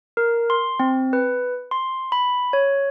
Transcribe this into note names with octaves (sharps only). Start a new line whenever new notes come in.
A#4
C6
C4
B4
C6
B5
C#5